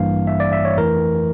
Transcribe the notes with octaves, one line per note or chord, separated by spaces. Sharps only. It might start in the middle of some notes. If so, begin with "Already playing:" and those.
Already playing: A1 G2 E3 G3 A#3 F5
E5
D5
E5
C#5
F2 E3 A3 A#4